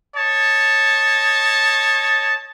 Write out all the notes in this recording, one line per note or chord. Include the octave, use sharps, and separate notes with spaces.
C#5 D#5 A5